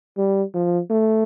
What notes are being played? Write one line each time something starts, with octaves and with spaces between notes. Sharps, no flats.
G3
F3
A3